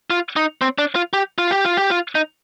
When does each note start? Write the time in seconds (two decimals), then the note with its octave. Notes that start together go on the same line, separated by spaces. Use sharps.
0.10 F4
0.36 D#4
0.61 C4
0.78 D4
0.96 F4
1.13 G4
1.38 F4
1.51 G4
1.64 F4
1.77 G4
1.90 F4
2.15 D#4